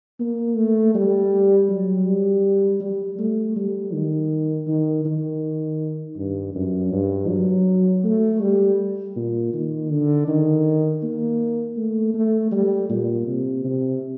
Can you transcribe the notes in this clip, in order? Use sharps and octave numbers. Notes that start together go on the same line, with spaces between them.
A#3
A3
G3
F#3
G3
G3
A3
G3
D#3
D#3
D#3
G2
F#2
G2
F#3
A3
G3
A#2
D#3
D3
D#3
A#3
A3
A3
G3
A#2
C3
C3